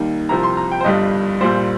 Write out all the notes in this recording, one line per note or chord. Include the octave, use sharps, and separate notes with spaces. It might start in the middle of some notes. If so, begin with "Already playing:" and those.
Already playing: D#2 D#3 G3
C2 C3 F3 A#5
C6
A#5
G5
C5
G1 G2 G3 D#5
A#1 A#2 G3 C5